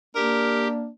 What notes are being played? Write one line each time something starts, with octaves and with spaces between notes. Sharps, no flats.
A#3 D4 G4 A#4